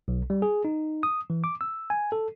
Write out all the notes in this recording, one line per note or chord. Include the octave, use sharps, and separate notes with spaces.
B1
G3
G#4
D#4
D#6
E3
D6
E6
G#5
A4